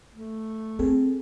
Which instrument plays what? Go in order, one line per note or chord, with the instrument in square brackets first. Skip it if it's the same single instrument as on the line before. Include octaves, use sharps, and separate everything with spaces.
[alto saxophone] A3
[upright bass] C4 [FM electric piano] G#4 A4